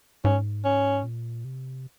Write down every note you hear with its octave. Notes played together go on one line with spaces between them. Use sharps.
G#2 C#4
C#4
A#2
C3